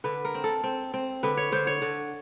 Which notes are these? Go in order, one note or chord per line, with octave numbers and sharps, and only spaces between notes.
D3 B4
A#4
C4
A4
C4
C4
D3 B4
C#5
D3 C5
C#5
D3